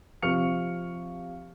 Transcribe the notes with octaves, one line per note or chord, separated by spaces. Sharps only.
C3 F3 C#6 F6 C#7 F7